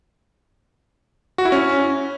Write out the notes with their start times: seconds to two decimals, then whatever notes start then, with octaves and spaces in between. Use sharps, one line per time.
1.38 F#4
1.45 E4
1.52 C#4